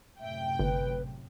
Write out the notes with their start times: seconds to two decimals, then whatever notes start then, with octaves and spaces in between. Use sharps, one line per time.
0.20 F#2 A2 C3 E5 G5
0.59 G1 B4